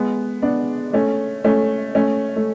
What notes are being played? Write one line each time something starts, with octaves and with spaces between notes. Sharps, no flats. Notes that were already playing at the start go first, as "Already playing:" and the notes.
Already playing: G#3 B3
B3 D4
A3 C#4
A3 C#4
A3 C#4
A3